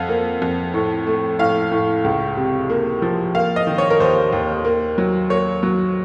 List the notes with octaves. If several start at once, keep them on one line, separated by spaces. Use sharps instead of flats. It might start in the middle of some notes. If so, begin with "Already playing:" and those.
Already playing: F2 F5 F#5
A#3
F2
A2
A3
A2 F5
A2
C#2
C3
A#3
F3
A#3 F5
D#5
D#3
C#5
A#4
D#2 C5
D#2
A#3
F#3
A#3 C#5
F#3